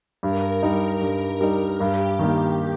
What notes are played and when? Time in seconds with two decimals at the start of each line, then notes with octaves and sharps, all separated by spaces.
0.23 G2 A#4
0.62 G3 D#4
1.01 G2 A#4
1.41 G3 D#4
1.80 G2 G4
2.19 D#3 A#3